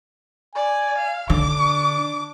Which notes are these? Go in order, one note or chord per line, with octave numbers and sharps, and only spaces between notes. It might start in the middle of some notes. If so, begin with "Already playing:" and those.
D5 G#5
F5
D3 D4 D6